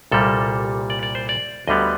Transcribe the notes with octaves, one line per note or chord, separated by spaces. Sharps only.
C2 A#2 G3 A#3 A4
D5
D5
C5
D5
D2 D3 G3 B3 D#5